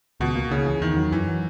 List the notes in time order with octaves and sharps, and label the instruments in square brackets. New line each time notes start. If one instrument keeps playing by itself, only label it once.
[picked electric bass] C#2 [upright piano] B2
[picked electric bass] A#3
[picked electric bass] C#2 [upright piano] C#3
[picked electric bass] E3
[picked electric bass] E2 [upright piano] D#3
[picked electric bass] F#3
[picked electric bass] F#2 [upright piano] E3
[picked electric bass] F#3